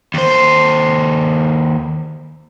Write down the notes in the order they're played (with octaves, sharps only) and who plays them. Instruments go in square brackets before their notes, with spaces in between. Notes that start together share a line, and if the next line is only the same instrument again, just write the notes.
[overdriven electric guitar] D#2 C5